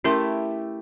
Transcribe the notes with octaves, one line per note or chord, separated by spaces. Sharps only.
A3 C#4 E4 G4 A#4 C6